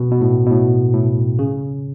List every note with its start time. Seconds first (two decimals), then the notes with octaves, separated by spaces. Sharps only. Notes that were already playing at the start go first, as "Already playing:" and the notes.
Already playing: B2
0.11 B2
0.21 A2
0.46 B2
0.50 A2
0.94 A2
1.39 C#3